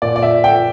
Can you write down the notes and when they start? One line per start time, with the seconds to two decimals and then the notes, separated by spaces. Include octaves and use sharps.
0.02 A#2 D5
0.16 D5
0.23 E5
0.44 G5